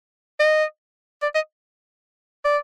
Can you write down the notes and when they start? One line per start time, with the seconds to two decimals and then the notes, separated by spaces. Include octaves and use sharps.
0.40 D#5
1.22 D5
1.35 D#5
2.45 D5